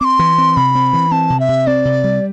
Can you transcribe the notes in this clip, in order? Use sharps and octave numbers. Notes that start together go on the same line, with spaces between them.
C4 C6 D6
E3
C4
C3 B5
C4
E3
C4 A5
C3
E5
C3
C4 D5
C3
G3